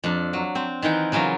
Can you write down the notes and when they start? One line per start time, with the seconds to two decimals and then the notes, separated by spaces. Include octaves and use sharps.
0.04 F2 D4
0.33 F#3
0.55 C4
0.82 D#3 E3 F#5 G5
1.12 C#3 E3 F#3 F4 A#5